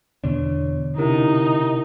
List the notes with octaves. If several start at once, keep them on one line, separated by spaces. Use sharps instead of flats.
E2 B2 D3 D4 C#5
C3 C#4 D#4 E4 A#4